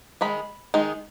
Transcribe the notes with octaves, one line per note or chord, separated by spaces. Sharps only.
D#3 G#3 D#4 B5
D#3 G#3 D#4